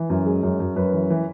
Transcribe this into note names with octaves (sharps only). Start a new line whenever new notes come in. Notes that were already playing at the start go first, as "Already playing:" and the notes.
Already playing: E3
F#2
G#3
F#2
F#2
F#2 B4
E3
E3